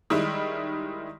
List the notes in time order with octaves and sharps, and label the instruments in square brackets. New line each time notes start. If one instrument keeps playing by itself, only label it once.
[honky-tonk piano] D#3 G3 G#3 E4